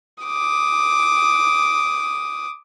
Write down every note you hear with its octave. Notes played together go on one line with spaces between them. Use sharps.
D6 D#6